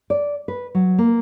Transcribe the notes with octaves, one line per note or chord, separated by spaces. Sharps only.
D5
B4
F#3
A#3